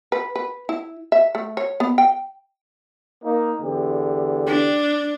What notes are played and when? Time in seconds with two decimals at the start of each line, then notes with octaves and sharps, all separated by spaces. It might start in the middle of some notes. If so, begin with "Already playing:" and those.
0.12 B4
0.36 B4
0.69 E4
1.12 E5
1.35 A3
1.57 C#5
1.80 B3
1.98 G5
3.24 A#3 D#4
3.62 E2 D3 G4
4.47 D4